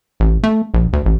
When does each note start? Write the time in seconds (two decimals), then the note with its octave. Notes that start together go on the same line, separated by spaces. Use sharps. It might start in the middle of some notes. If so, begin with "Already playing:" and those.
0.20 A1
0.43 A3
0.74 A#1
0.93 D2
1.05 A1